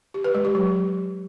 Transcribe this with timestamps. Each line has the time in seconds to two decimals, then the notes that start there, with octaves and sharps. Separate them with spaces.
0.14 G4
0.24 B4
0.35 G#3
0.45 G4
0.55 F#3